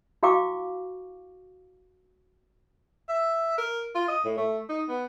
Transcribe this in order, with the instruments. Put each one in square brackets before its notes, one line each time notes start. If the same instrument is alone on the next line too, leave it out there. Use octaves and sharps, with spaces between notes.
[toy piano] E4 F#4 F5 G5 C#6 D6
[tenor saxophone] E5
A#4
F4
D#5
A2
A3
D#4
B3